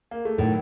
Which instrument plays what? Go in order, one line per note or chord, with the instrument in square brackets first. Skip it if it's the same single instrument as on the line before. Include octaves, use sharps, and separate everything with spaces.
[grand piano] A#3
A3
[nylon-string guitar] A2 [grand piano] D#3 F#3